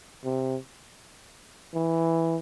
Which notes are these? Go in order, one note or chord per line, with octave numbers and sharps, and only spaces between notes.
C3
E3